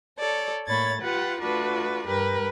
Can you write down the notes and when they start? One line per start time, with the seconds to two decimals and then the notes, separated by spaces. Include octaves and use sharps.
0.18 A4 C#5 D5
0.67 A2 A#3 C#5 B5 G#6 A6
1.01 F4 G4 B4 F#5
1.40 A3 D4 F4 F#4 B4
2.07 G2 G4 A#4 B4